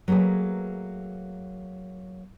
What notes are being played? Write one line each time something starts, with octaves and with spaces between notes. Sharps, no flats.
F#3 A3 A#3 G#4 B4